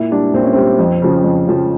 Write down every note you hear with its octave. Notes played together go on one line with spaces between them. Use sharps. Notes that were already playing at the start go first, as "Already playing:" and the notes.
Already playing: A#2 E4
G3 D4
A#2 C4
C#4
G3 C4
F2
C#3 F3
F2
C#3 F3